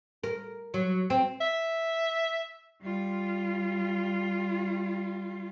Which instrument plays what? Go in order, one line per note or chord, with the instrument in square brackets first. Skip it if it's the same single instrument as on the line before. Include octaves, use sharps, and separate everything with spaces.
[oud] A#4
F#3
C4
[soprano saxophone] E5
[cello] G3 F4